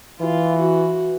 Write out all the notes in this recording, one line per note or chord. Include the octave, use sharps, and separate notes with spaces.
E3 F4
F#4